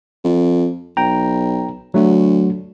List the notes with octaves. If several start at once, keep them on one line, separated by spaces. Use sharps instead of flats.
F2
B1 G5 A#5
D2 F#3 A3 F#4